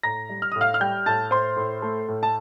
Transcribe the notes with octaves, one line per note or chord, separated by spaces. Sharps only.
A2 A#5 A#6
G3
F6
A2 D#6
F5 F6
F6
G3 G5 G6
A2 A5 A6
A2 C5 C6
A2
A3
A2
A5